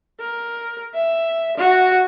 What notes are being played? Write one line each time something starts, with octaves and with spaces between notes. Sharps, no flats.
A#4
E5
F#4